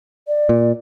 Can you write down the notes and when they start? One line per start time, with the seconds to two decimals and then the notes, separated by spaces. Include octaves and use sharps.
0.27 D5
0.49 A#2